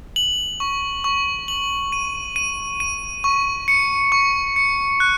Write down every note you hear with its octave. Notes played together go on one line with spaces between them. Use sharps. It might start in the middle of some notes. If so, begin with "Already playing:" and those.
F#7
C#6
C#6
F#7
D#7
D#7
D#7
C#6
C#7
C#6
C#7
F#6